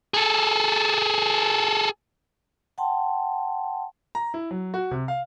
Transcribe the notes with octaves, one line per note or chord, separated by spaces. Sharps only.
G#4 A4
F#5 G5 A5 C6
A#5
E4
F#3
F#4
C3
F5